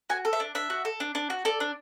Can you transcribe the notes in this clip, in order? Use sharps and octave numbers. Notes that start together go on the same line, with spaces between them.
F#4 G#5
A4
E5
D4
D4 E5
F#4
A4
D4
D4
F#4
A4 D5
D4